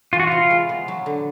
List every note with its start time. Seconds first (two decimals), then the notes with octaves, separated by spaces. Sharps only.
0.13 E3 F4
0.20 F#4
0.27 C3 F4
0.50 G#3
0.69 B3
0.88 F#3
1.06 D3